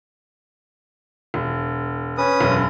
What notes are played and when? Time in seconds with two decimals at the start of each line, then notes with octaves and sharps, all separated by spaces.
1.34 E1
2.18 C#4 B4 D#6
2.40 E1 F#2